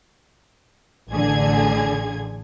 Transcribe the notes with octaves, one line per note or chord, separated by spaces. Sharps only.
A1 D3 G#4 G#6